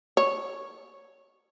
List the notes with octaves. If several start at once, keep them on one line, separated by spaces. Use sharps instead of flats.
C#5